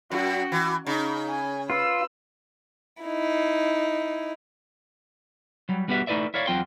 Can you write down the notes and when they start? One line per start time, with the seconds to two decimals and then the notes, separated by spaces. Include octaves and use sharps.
0.12 F#2 F#4 G5
0.52 E3
0.87 C#3 D#4
1.29 G#5
1.70 F4 B4 E6
3.02 D#4 E4
5.69 F#3 G3
5.88 G3 B3 F#4 G4 B4 E5
6.07 A3 D#4 E4 B4 D5 E5
6.34 E4 A#4 C#5 D5 F5
6.47 E2 F#3 C4 F4 G5 C6